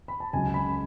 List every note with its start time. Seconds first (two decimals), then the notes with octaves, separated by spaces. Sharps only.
0.08 B5
0.20 A5
0.33 C#2 C#3 F#3 G#5
0.54 B5